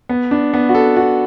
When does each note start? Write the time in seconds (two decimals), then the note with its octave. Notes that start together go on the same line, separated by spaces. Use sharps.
0.09 B3
0.31 D4
0.54 B3
0.69 F#4
0.75 A4
0.97 F#4